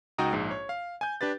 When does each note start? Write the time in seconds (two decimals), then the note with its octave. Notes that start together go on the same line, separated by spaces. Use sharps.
0.18 C#2 D#4 F#4 G5 A#5 D#6
0.33 A#1 G#2
0.51 C#5
0.69 F5
1.01 G#5 G6
1.21 D4 G4 B4 A6